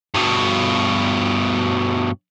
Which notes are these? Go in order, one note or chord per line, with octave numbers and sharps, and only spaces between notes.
G2 B2